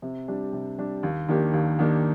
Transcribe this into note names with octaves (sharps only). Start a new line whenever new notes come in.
C3
G3 D4
C3
G3 D4
D#2
D#3 A#3 D4 G4
D#2
D#3 A#3 D4 G4